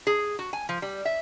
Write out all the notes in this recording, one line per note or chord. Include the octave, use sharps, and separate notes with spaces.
G#4
F#4
G#5
F3
G3
E5